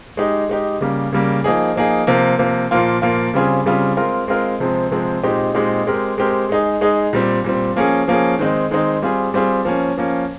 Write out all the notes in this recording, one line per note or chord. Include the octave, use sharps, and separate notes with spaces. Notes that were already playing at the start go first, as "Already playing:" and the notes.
G#3 D#4 G4
G#3 D#4 G4
C#3 G3 A#3
C#3 G3 A#3
F3 A#3 D#4 G#4
F3 A#3 D#4 G#4
C3 F3 A#3
C3 F3 A#3
A#2 F3 A#3 F4
A#2 F3 A#3 F4
C#3 G3 C4 F4 G#4
C#3 G3 C4 F4 G#4
G#3 C4 F4 A#4
G#3 C4 F4 A#4
C3 F3 G#3 C4
C3 F3 G#3 C4
A#2 G#3 C4 D#4 G4
A#2 G#3 C4 D#4 G4
G#3 C4 G4 A#4
G#3 C4 G4 A#4
G#3 D#4 G#4
G#3 D#4 G#4
A#2 G3 C4
A#2 G3 C4
F3 A#3 C#4 G#4
F3 A#3 C#4 G#4
D#3 G#3 C4 D#4
D#3 G#3 C4 D#4
G3 C4 F4 G#4
G3 C4 F4 G#4
F3 A#3 C#4
F3 A#3 C#4